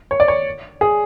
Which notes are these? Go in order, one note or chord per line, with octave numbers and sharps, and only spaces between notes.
C#5
D5
C#5
G#4